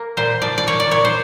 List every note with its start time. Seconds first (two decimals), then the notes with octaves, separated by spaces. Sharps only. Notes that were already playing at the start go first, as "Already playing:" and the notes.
Already playing: A#3
0.17 A#2 C5
0.42 F3 D5
0.58 D5
0.67 A#3 C#5
0.80 D5
0.91 A#2 C#5
1.05 C5